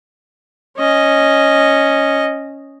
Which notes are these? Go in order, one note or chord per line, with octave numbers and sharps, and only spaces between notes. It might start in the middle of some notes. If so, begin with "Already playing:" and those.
C#4 D#5